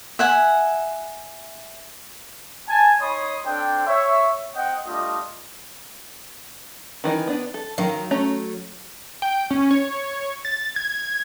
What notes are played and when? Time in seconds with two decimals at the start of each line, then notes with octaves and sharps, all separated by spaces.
0.19 E5 F#5 G#5
2.69 G#5 A5
3.00 D#4 C#5 D#5 B5 C6 D#6
3.46 C4 D4 A4 C5 G5
3.87 C#5 E5
4.56 C4 D#5 F#5 G5
4.87 G3 A3 D4 F4 D#5
7.04 D#3 E3 D#4
7.27 B3 D4
7.54 A4
7.78 D#3 F#3 F5
8.11 A3 C#4 A#5
9.22 G5
9.51 C#4
9.71 C#5
10.45 A6
10.76 G#6